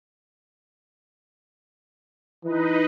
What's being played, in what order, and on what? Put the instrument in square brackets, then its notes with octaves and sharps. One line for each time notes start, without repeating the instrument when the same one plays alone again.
[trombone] E3 [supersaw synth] D#4 B4 D#5